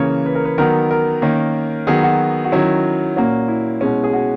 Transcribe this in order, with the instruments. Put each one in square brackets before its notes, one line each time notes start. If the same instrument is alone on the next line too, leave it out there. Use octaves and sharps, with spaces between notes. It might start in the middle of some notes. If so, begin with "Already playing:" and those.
Already playing: [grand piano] C#3 E3 A#3 C#5
B4
A#4
B4
D#3 F#3 B3 A#4
A#4
D#3 A#3 C#4
D#3 F#3 B3 G#4
F#4
F#4
D#3 F#3 C#4 E4
A#2 A#3 C#4 F#4
E4
B2 G#3 C#4
G#4
F#4